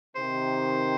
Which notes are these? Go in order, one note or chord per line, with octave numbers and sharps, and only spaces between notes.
C3 D#3 C5